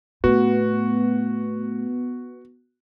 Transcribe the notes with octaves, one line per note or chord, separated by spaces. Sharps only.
A2 B3 F#4